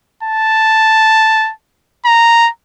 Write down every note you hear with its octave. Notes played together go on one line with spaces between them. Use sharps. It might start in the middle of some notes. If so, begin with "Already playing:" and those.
A5
A#5